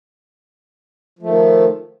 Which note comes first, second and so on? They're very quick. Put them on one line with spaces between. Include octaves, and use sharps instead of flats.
F3 A3 D#3